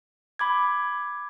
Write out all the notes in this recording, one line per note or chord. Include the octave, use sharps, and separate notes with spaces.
B5 D6 G#6